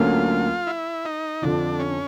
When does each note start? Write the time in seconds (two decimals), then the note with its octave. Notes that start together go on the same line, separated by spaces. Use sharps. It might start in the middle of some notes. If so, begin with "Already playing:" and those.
Already playing: D2 D3 F#3 A#3 C#4 F4
0.67 E4
1.05 D#4
1.42 F2 D3 F3 D4
1.79 C#4